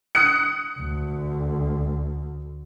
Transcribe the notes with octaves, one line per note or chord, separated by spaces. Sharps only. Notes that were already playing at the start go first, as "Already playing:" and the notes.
D#6 F#6 C#7
D2